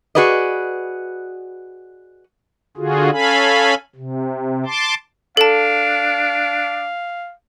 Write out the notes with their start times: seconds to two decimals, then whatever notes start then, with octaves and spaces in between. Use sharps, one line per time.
0.15 F#4 G#4 B4 D5 D#5
2.77 D3 F4 F#4 G#4
3.12 C#4 A4 F5 G#5 B5
3.96 C3
4.66 A5 C6 D6
5.37 D4 A4 F5 A5